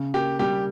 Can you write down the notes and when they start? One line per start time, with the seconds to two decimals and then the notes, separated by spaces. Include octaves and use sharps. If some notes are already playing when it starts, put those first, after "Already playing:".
Already playing: C#3
0.14 A#3 G4
0.39 G3 G4